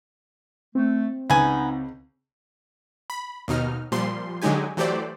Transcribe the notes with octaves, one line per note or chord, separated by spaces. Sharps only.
A3 C4
C#2 B3 D#4 G#5
B5
D#2 B2 D#4 F6
A#2 F3 G3 C6
D3 F#3 G#3 D#4 G4 G#5
E3 F#3 A3 G4 C5 D5